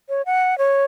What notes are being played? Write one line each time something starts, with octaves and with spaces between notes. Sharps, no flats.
C#5
F#5
C#5